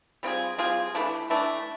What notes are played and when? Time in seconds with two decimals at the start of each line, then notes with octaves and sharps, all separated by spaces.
0.23 G3 C4 F4 G#4
0.58 G3 C4 F4 G#4
0.95 E3 A3 D4
1.30 E3 A3 D4